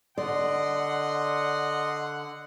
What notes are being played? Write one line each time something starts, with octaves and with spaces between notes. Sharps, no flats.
D3 D5 D#5 F#5 C6